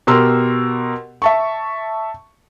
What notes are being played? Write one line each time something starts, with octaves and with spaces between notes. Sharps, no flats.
B2 G4 A#4 C6 E6
E5 A5 C#6